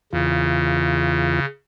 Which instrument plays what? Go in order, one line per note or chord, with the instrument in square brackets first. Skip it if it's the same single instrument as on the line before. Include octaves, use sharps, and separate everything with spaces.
[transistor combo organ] E2 F4 [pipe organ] C#3